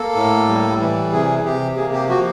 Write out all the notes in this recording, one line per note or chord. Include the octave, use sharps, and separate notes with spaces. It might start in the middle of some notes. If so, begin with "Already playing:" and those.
Already playing: A#3 A4
A2
G3
E3
C3 G#4
C3 G4
A#3 G#4
G4
F3 F#4